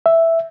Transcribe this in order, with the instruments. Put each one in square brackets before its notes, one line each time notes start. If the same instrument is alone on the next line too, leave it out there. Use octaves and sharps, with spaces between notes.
[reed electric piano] E5